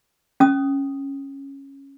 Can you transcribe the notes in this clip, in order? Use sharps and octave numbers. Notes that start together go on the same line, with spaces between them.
C#4 D#6